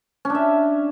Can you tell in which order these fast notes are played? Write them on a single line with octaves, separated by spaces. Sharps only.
C#4 D4 E5